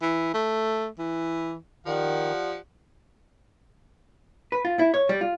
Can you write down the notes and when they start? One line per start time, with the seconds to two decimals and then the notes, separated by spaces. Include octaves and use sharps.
0.02 E3
0.34 A3
0.99 E3
1.86 D#3 F3 G4 D5 F#5
4.52 B4
4.65 F4
4.79 E4
4.94 C#5
5.09 G3
5.21 F4